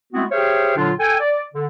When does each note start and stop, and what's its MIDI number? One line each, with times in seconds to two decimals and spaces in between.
0.13 0.24 56
0.13 0.24 57
0.13 0.24 59
0.13 0.24 60
0.13 0.24 64
0.13 0.24 66
0.31 0.73 67
0.31 0.73 68
0.31 0.73 72
0.31 0.73 73
0.31 0.73 76
0.31 0.73 77
0.77 0.91 46
0.77 0.91 50
0.77 0.91 54
0.77 0.91 62
0.77 0.91 65
0.99 1.19 69
0.99 1.19 79
0.99 1.19 80
1.19 1.42 74
1.54 1.66 50